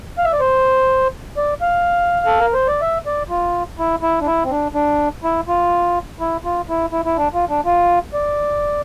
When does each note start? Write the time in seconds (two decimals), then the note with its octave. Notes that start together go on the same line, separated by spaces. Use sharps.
0.18 F5
0.25 E5
0.33 D5
0.40 C5
1.37 D5
1.61 F5
2.26 A4
2.40 A#4
2.54 C5
2.67 D5
2.81 E5
3.06 D5
3.29 F4
3.79 E4
4.02 E4
4.21 D4
4.27 E4
4.44 C4
4.51 D4
4.75 D4
5.24 E4
5.48 F4
6.20 E4
6.45 F4
6.69 E4
6.92 E4
7.05 E4
7.17 D4
7.34 F4
7.50 D4
7.65 F4
8.14 D5